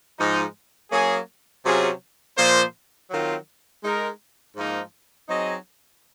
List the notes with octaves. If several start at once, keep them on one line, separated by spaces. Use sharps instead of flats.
G#2 F3 G#3 D#4
F#3 A#3 C#4 G#4
C3 F#3 C#4 F4 G#4
A#2 F3 A#3 F4 C5
D#3 F#3 C4 F4
G#3 D#4 A#4
G#2 F3 A#3 D#4
F#3 C4 D#4 G#4 D#5